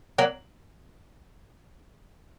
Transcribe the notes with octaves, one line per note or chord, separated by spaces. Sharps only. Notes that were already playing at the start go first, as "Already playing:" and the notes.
F#3 A#3